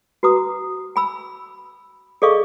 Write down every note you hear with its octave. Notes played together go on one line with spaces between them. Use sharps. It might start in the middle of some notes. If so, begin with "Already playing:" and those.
F#4 B4 A#5 D#6
G#5 B5 E6
G#4 A4 D5 D#5 F5 C#6